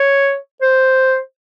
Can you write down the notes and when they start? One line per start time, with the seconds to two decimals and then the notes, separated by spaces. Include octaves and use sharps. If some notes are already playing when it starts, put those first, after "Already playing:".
Already playing: C#5
0.61 C5